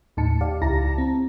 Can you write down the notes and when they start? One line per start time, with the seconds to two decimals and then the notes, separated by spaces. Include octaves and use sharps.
0.17 D#2 A2 D#4 A5 C#7
0.41 G4 D5 F5
0.62 C#2 E4 G4 A5 A#5 A#6
0.98 C4